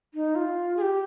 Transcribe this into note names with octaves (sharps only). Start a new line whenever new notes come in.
D#4
F4
G#4
G4